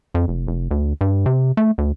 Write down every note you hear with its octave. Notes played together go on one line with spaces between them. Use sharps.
F2
F1
F1
D2
G2
C3
A3
D2